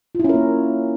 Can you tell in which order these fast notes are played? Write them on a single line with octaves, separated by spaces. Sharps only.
F4 E4 C#4 A#4 A#3